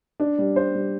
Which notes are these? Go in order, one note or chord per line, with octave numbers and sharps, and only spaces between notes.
D4
G3
C5
G3